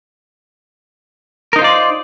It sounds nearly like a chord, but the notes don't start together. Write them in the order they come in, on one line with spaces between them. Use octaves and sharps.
A#4 D#4 C5 F4 D5